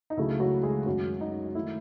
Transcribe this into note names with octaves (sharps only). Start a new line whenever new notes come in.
D#4
C#2 C#3 F#3 A3 E4
F#3 F#4
G#3 G#4
F#2 D#3 F#3 G#3 F#4
D#4
D#3 A3 E4